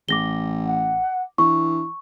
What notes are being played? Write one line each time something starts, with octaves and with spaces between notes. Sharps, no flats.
A1 D6 A#6 G7
F#5
E3 D4 C#6